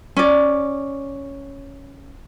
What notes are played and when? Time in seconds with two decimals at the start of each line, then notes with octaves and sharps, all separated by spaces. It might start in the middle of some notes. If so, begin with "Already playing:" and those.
0.17 C#4 D5